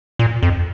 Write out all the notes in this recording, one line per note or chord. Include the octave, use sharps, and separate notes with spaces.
A#2
F2